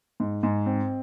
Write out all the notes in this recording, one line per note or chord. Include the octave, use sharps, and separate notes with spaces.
G#2
G#2
C4